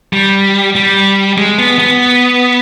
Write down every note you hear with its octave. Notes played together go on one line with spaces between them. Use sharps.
G3
G3
G#3
B3
B3